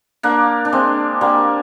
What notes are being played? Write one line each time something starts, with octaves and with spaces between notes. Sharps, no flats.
A#3 D4
D4
G#3 C4
G3 A#3